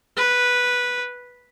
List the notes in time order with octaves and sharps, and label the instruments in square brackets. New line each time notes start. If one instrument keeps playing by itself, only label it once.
[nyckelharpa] B4